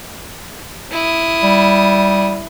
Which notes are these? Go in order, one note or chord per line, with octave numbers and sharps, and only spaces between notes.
E4 D#6
G3